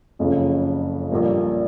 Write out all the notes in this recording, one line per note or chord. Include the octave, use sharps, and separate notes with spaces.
F#1 F2 C#3
A#1 A#2 G3 A#3